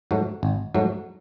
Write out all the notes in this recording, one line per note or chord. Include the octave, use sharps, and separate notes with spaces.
G#2 F#3 A3
G#1
G#2 F#3 A3